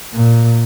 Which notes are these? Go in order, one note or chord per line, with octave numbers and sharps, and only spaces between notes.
A#2